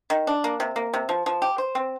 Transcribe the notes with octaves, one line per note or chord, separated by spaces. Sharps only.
D#3
D4
A#3
C3
A#3
C3
F3
F3
G4
C5
C4